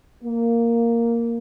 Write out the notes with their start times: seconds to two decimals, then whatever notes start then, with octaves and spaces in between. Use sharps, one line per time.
0.24 A#3